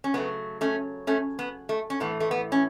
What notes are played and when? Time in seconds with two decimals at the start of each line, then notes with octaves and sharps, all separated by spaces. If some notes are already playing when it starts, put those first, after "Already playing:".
0.04 C#4
0.14 C#3 F#3 A3 B3
0.61 A3 C#4
1.07 A3 C#4
1.39 B3
1.69 A3
1.90 C#4
2.00 A2 E3 A3 B3
2.20 A3
2.31 B3
2.52 C#4